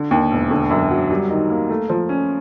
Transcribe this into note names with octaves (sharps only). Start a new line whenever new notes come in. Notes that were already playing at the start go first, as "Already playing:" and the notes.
Already playing: D3
D#2
E1
D3
F#2
F#3
G3
D#3
A#3
A3
F3
C#4